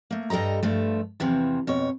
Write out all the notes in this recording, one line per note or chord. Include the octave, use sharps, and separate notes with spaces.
A3 A#3
G2 G3 A4 D#5 A#5
G2 F3 A3
E2 C3 E3 F3
F2 B2 C#5